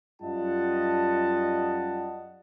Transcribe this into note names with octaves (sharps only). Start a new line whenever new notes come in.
F#2 G3 F4 D#5 F#5 A5